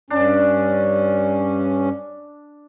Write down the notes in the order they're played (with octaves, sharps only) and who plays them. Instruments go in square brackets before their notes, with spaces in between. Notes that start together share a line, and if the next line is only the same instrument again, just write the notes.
[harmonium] G2 C#4 [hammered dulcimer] D4